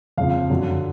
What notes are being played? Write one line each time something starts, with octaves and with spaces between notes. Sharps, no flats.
F2 C#3 F3 F5
F#2 D3 F#3